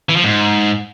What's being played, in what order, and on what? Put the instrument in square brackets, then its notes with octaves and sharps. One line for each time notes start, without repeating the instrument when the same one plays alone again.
[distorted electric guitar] E3
F3
G#2